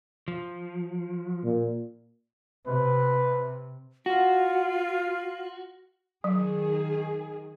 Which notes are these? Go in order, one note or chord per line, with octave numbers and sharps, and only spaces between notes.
F3
A#2
C3 B4
F4 F#4
D#3 F#3 G#4